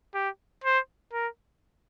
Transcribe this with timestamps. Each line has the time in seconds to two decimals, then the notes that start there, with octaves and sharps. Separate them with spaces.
0.14 G4
0.64 C5
1.13 A#4